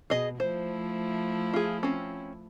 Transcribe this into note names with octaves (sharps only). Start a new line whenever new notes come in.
B2 G#4 D#5
F3 A3 E4 C5
F4 G#4
C4 C#4